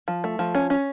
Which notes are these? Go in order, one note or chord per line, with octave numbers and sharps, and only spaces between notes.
F3
A3
F3
C#4
C#4